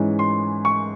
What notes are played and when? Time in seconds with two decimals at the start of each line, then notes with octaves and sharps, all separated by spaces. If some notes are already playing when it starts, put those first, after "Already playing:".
Already playing: G#2 E3 G#3 C#4
0.19 C6
0.65 C#6